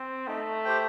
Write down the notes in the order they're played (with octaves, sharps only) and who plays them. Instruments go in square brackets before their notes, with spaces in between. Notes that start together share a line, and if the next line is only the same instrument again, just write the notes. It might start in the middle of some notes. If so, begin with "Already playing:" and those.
Already playing: [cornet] C4
[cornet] A3 [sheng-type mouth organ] D#4
[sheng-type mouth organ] G4 C5 G5